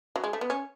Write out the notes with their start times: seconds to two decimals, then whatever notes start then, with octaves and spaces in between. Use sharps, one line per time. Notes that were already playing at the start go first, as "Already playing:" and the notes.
0.16 F#3
0.24 G#3
0.33 A3
0.41 B3
0.50 C#4